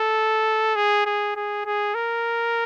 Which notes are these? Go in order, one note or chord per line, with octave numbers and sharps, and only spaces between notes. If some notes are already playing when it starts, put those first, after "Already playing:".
Already playing: A4
G#4
G#4
G#4
G#4
A#4